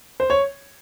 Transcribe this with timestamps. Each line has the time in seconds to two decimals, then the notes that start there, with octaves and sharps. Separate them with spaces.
0.20 C5
0.30 C#5